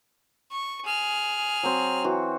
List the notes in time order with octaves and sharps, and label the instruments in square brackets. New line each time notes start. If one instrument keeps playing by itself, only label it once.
[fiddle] C#6
G#4 F6
[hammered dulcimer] F#3 C4
E3 F#4